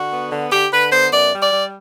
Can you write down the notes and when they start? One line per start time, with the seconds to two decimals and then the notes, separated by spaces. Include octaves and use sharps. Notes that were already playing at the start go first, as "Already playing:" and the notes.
Already playing: D3 F#4
0.11 B3
0.30 D3
0.51 D3 G4
0.71 D3 B4
0.92 B3 C5
1.12 F#2 D5
1.33 G3
1.42 D5
1.53 G3